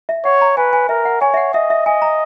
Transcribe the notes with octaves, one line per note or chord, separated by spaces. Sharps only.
E5
C#5 F#5
A#5
B4 G#5
G#5
A#4 E5
F#5
C#5 G#5
E5
F#5
D#5 E5
E5
D#5 G#5
A#5